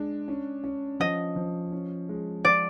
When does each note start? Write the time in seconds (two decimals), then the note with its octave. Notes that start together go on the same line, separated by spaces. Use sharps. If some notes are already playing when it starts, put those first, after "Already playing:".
Already playing: G#3 D4
0.28 C#4
0.64 C#4
1.00 F3 D#5
1.36 F3
1.72 C#4
2.09 G#3
2.45 F3 D5